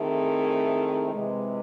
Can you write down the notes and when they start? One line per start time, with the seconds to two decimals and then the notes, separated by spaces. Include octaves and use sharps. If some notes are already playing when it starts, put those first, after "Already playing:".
Already playing: D#3 A3 C4 E4 G#4
1.09 C3 E3 G#3